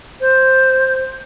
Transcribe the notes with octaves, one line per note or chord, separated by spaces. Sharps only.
C5